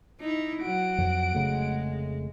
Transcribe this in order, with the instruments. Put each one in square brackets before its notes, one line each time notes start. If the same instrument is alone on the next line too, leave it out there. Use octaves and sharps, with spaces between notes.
[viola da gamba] D#4 E4
[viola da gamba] F#3 [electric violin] F#5 D7
[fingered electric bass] F2
[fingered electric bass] F1 C#3 A3 [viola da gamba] G#3